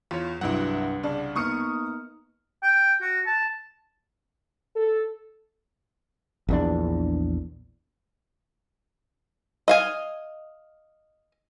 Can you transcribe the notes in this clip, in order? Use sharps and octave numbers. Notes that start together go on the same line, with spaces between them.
E2 F4 C#5
C2 G2 F#3 E4 F#5
C#3 D4
A#3 B3 D#4 C#6 D#6 F6 C#7
G5
F#4
A5
A4
A#1 E2 D4
D#5 F5 G#5